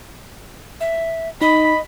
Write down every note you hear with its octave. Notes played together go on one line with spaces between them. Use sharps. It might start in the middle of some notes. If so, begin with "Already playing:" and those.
E5
D#4 D#5 B5